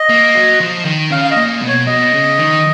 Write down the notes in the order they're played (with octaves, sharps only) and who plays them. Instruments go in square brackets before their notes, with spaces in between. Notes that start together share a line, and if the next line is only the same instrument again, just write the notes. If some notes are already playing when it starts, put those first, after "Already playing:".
Already playing: [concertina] D#5
[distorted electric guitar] A#3
F#3
F3
D#3
[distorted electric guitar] C#3 [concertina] F5
[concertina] F5
D#5
[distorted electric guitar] A#2
B2
[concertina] C#5
[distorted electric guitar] B2 [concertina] D#5
[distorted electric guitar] C#3
D#3